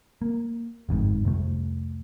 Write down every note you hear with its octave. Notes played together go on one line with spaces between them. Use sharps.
A#3
G1 F2 G#2
C2 F2 A3